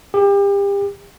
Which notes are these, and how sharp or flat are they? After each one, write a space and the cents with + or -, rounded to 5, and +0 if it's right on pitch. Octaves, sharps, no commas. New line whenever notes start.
G4 +35